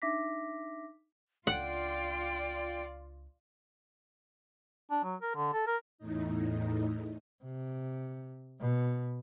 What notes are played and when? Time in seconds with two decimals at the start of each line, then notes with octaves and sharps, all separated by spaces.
0.02 D4 D#4 E5 D6 A#6 B6
1.47 C#2 D4 F4 D5 F#5 G5
4.91 D4
5.04 F#3
5.22 A#4
5.35 D3
5.54 A4
5.67 A#4
5.98 E2 A2 D#4
7.44 C3
8.61 B2